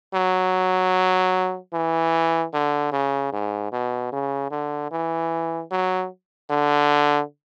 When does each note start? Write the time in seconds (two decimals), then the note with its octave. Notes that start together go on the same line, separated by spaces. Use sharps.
0.14 F#3
1.73 E3
2.53 D3
2.92 C#3
3.33 G#2
3.72 B2
4.13 C#3
4.51 D3
4.91 E3
5.71 F#3
6.50 D3